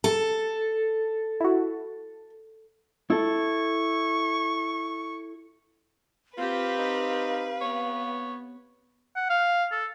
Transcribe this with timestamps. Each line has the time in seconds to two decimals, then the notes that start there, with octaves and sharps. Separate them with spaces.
0.04 A4
1.40 E4 F#4
3.10 E4 A4 C#6
6.38 C4 F4 G4 B4 F5
6.79 D#4
7.61 B3 C#5
9.16 F#5
9.30 F5
9.72 A4